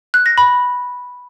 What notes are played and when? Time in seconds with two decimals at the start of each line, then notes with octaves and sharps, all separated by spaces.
0.14 F#6
0.26 A#6
0.38 B5